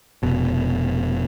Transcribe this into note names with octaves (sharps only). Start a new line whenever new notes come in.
F1 B2